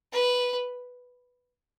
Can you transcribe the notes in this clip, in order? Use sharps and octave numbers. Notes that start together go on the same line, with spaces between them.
B4